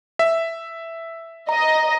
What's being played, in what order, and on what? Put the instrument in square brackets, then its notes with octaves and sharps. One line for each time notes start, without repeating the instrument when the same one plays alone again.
[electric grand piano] E5
[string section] D#5 [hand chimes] A#5